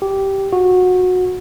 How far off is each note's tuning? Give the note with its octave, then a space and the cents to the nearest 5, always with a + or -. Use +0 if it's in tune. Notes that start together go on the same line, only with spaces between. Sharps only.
G4 -10
F#4 -20